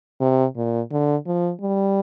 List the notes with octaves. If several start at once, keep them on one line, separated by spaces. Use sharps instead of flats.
C3
A#2
D3
F3
G3